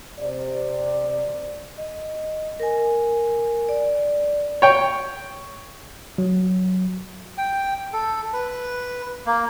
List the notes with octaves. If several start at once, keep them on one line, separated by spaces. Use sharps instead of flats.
C3 D5
D#5
A#4 G#5
D5
C#5 G5
F#3
G5
A4
B4
A#3